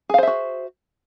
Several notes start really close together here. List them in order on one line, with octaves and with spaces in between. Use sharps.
G#4 F5 C5 E5 F#4